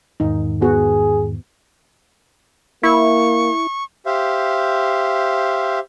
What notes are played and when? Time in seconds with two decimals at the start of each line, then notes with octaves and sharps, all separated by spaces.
0.20 E2 G#2 D#3 D#4
0.62 B3 F#4 G#4
2.83 A#3 E4 C#6
4.06 G4 C5 E5 F5